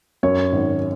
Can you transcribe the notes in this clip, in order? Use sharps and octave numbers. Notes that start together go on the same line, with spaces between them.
F#2 C#5
G#1